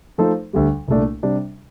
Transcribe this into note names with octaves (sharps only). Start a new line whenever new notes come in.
F3 A3 D#4 A4 C5
D2 D3 G3
C2 A#2 A3 D4
C3 G3 D4